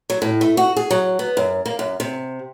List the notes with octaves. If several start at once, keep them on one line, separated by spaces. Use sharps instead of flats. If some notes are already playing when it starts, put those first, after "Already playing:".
F#3
A2
A3
F#4
G#4
F#3
B3
F#2
A#3
F#2
C3